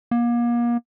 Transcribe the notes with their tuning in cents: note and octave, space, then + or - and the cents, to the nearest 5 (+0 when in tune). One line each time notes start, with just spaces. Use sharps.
A#3 +35